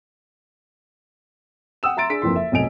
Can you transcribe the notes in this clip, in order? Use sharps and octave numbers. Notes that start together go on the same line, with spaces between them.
F#5 G5 D#6 E6 E7
E5 A#5 C6 A6 D7
D4 G#4 B6 D7
F#1 F2 E3 C6
E5
F1 B1 D#5 G#5 D7 F7